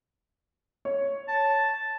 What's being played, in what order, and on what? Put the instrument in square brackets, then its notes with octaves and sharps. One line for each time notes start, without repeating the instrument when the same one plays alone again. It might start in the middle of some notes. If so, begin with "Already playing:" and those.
[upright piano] C#5
[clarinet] A5